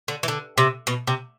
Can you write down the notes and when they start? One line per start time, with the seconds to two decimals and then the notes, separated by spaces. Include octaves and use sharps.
0.08 D3
0.23 E3
0.28 D3
0.58 C3
0.87 B2
1.07 C3